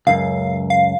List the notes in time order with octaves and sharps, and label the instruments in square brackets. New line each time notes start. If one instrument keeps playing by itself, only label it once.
[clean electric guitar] C#2 F#2 [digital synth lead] F5
[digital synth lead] F5